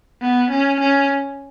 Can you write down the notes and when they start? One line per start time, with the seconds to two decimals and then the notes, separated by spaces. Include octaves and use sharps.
0.21 B3
0.50 C#4
0.80 C#4